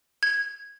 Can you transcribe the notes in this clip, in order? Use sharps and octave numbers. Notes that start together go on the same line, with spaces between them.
G#6